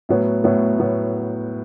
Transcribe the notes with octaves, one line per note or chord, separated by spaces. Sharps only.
A2 F#3 B3
A2 F#3 B3
A2 F#3 B3